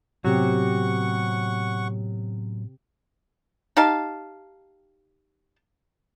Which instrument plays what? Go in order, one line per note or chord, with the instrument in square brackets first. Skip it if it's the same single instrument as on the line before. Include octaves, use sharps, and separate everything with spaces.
[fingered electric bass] A2 B3 [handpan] C3 C4 G4 [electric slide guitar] F#3 [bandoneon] F#5 C#6
[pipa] D#4 G4 F5 A5